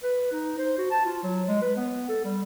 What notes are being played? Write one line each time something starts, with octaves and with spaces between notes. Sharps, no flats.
B4
D#4
C5
F#4
A5
F4
F#3
G#3
B4
B3
A4
G3